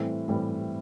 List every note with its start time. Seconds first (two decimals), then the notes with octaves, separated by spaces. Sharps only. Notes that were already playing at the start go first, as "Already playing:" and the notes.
Already playing: A2 E3 G3 C4
0.28 A2 E3 G3 C4